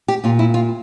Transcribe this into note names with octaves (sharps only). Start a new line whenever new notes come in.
G4
A#2 F4
E4
F4